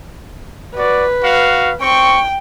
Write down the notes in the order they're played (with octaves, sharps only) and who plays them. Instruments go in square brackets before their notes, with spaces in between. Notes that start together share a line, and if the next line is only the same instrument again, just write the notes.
[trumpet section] F#4 D5 [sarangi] B4
[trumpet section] F#4 F5
[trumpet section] C4 C#6 [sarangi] G5